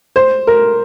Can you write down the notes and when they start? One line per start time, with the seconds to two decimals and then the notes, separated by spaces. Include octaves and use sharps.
0.16 C5
0.47 A#4